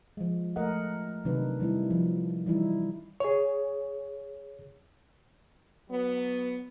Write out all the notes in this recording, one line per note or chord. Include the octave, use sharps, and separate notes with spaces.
F3 G#3
A3 A#4 D#5 F#5
C3 D#3 F#3 D4 D#4 B4
D#3 G3 C4 E4
F3
E3 G3 D#4 E4
G#4 C#5
F#3 B3